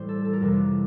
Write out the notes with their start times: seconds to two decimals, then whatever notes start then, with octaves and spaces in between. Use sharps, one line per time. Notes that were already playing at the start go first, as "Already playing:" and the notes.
Already playing: A2 E3 G3 C5
0.09 A4
0.25 A4
0.33 A#4
0.40 F2 C3 E3 G3 A4